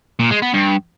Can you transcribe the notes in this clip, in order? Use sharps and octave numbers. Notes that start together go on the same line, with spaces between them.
A#2
G#3
B3
G2